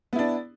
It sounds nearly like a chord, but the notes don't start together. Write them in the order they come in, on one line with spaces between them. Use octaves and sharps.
B3 E4 D4